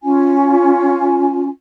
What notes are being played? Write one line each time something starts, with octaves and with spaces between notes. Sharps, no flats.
C#4 F4 G#5